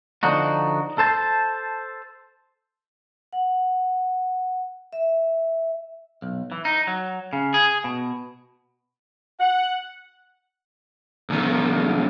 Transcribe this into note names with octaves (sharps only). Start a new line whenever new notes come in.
D3 F3 D4 D#4 F#4
A4 C5 A5
F#5
E5
B1
E3
D#4
F#3
C#3
G#4
B2
F#5
C2 D#3